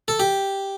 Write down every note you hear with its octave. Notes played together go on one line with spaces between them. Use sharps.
A4
G4